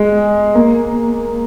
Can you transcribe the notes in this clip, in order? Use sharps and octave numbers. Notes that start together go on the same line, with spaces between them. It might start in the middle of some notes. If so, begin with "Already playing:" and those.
Already playing: G#3
A#3